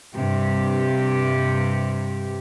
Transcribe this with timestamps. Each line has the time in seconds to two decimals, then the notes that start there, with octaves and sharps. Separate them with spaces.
0.16 G2 C3 G4